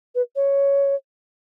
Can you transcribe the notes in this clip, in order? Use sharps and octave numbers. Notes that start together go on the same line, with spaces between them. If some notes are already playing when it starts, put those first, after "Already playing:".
B4
C#5